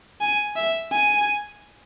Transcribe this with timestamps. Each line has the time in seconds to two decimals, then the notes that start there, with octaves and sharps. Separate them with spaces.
0.21 G#5
0.56 E5
0.91 G#5